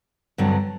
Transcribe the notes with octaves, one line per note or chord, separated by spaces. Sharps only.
G2 D3 F#3 C4